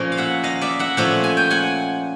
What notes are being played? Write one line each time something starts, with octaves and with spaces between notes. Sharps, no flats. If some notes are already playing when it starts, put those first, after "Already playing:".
Already playing: A#2 F3 A#3 C#4
F5
E5 F#5
D#5 F5
D5 E5
E5 F#5
A#2 F3 A3 C#4 E5 F#5
G#5
G5
F#5 G#5